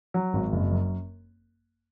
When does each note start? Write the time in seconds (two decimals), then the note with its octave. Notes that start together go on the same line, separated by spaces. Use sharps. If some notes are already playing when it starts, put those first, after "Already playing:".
0.14 F#3
0.33 G#1
0.52 F#1
0.71 F#2